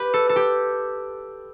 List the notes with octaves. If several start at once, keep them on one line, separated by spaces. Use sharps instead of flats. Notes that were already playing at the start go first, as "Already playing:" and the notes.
Already playing: G4 B4
A4
A4
G4